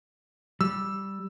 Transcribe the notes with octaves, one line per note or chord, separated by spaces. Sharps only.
G3 E6